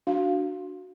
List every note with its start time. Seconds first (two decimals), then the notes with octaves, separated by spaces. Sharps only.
0.07 D4 F#4 F5